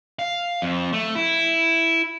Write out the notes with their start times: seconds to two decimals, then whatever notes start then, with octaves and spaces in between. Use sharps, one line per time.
0.19 F5
0.62 F2
0.93 A3
1.15 E4